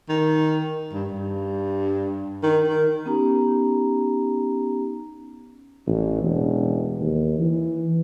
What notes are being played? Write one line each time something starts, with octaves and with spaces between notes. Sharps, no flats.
D#3
G2
G2
D#3
D#3
B3 C#4 D#4 G4 A#5
A1
E1
D#2
E3